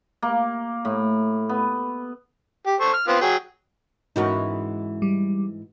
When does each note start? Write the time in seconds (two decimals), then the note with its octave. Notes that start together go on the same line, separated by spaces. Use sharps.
0.23 A#3
0.85 A2
1.49 B3
2.66 G4
2.80 A4 C5 C#6
2.93 F6
3.08 B3 C4 F4
3.21 F#3 G#4 G5
4.16 G#2 E3 C#4 D#4 F#4 A#4
5.02 G3